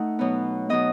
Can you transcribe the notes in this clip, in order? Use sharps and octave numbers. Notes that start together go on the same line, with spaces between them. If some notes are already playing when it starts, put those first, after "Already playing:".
Already playing: A3 D#4 F#5
B2 F#3 B3
B2 F#3 B3 D#5